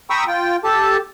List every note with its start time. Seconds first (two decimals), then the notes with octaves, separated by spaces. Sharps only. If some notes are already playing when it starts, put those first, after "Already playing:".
0.10 G5 A#5 B5 C#6 D#6 E6
0.27 F4 G5
0.64 G4 A4 A5